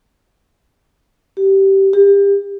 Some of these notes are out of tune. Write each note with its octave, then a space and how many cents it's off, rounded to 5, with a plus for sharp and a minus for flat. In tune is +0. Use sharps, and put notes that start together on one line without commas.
G4 -15
G4 +30